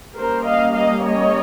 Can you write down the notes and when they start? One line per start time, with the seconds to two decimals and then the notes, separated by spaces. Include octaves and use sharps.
0.19 G3 A#3 C#4 A#4 C5
0.47 D#5 F5
0.77 D#5 F5
1.06 C#5 D#5